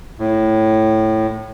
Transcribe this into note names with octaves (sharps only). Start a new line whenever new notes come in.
A2